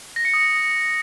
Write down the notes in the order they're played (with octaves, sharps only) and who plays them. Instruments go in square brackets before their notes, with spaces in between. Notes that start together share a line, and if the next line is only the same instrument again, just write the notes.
[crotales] A#6
C#7
D#6